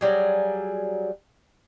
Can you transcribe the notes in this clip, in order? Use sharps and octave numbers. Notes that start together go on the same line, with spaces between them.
F#3 G3 G#4